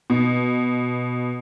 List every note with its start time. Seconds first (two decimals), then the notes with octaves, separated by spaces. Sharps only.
0.10 B2